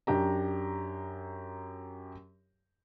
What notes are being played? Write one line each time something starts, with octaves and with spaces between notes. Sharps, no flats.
F#2 D4 G4 A#5